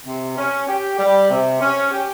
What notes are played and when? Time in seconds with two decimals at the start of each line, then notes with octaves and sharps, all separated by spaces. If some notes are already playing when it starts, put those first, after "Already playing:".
0.06 C3
0.37 C#4
0.68 G4
0.99 G3
1.30 C3
1.61 C#4
1.91 G4